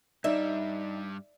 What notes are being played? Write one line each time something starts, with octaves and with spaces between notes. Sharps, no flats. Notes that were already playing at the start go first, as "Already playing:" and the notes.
G2 G3 D#4 D5 E5